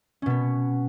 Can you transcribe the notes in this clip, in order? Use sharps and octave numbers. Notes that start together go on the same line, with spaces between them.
B2 B3 C#4